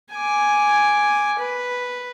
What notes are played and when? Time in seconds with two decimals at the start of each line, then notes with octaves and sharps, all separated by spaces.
0.13 G#5 D6
1.39 B4